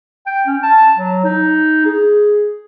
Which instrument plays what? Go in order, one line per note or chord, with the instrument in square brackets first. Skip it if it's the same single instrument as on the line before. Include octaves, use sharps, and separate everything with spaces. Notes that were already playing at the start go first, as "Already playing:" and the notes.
[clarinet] G5
C#4
A5
F#3
D#4
G#4